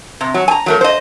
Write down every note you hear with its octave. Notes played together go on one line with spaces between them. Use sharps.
C3
F#3
G#5 A#5
F#3 A3 A#4
C5 D#5